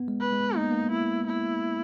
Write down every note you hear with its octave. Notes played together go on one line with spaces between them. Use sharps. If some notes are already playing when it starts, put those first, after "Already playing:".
Already playing: B3
G#3
B4
G#3
A#3 D#4
B3
A#3
E4
E4